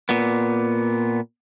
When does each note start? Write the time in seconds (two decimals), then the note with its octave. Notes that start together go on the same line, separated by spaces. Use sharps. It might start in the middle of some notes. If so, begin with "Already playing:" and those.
0.09 A#2 B3